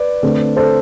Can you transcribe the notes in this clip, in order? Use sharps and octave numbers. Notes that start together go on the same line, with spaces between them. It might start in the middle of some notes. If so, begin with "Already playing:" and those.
Already playing: B4 D5
D3 A3 C4
A4 C5